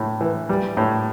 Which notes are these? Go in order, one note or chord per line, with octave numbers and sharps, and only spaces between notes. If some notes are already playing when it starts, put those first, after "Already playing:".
Already playing: A2
E3
G3
A2